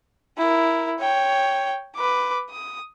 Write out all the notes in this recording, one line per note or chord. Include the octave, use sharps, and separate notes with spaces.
E4 A#4
C#5 G5
B4 D6
D#6